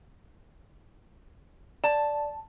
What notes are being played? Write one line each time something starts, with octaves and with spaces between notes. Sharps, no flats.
D5 A5